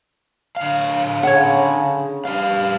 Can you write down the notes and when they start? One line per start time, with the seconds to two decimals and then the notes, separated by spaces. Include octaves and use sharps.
0.57 D3 F5
1.23 C#3 C#5 F#5
2.25 G2 G3 F5